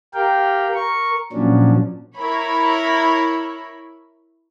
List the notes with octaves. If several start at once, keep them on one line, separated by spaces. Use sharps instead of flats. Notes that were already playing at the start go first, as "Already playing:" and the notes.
G4 A#4 F5 G5
A#4 C#6
A#2 F3 F#3 C#4 D4
E4 A#4 C#5 B5